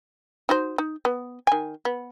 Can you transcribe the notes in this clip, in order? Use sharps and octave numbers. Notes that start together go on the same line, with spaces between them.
D#4 F#4 C5
D#4
B3
D#3 G#5
B3